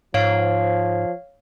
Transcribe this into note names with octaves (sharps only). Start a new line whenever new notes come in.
G#2 F3 C#5 F5